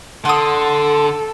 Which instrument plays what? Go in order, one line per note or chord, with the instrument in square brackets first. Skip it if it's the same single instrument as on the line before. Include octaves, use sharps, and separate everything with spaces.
[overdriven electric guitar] D3 [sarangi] A4 [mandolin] F#5 D#6 [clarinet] C6